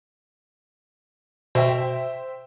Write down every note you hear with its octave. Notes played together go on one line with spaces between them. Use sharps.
B2 C5 E5 G5